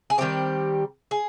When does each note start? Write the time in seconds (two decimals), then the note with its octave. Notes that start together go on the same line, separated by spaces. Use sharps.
0.10 G#4
0.18 D#3 G3 C4 G4
1.11 G#4